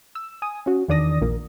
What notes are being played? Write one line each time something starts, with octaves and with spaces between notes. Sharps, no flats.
E6
G#5 D#6
C#4 F#4
E2 D#3 D4 D5 D#6 A#6
A#1 A#2 A#3